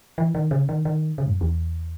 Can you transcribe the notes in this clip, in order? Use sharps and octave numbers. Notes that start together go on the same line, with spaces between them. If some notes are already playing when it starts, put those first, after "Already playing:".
E3
D#3
C#3
D#3
D#3
C#3
G#2
F#2
E2